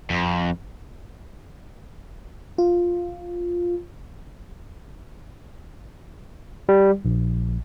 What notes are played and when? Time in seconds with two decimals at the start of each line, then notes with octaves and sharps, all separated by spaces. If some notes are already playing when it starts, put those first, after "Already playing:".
0.10 F2
2.58 F4
6.69 G3
7.05 A#1